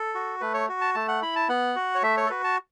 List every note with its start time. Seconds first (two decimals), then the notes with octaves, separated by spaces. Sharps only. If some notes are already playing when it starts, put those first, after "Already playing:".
Already playing: A4
0.15 F#4
0.41 A3 B4
0.54 C#5
0.69 F#4
0.81 A5
0.95 A3 A5
1.08 F#5
1.22 E4 B5
1.36 A5
1.49 B3 F#5
1.76 F#4
1.95 C#5
2.03 A3 E5
2.17 C#5
2.26 A4
2.30 F#4 B4
2.44 A5